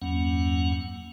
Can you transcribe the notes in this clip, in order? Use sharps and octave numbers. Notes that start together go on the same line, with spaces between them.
E2 G2 F#3 A#3 C#4 F#5